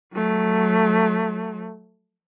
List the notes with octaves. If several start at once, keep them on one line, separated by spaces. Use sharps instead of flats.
F#3 A3